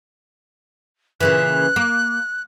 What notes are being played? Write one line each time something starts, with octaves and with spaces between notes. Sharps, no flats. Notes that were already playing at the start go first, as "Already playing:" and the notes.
A#2 C#3 E3 F#6
A#3